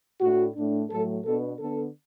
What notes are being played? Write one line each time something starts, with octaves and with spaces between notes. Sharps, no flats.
A2 A3 D4 F#4
A2 A3 D4
A2 F#3 A3 A4
B2 B3 D4 A4
D3 B3 D4 A4